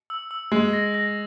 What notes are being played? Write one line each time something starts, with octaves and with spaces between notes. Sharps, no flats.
E6
E6
G#3 E6
A#6
A#6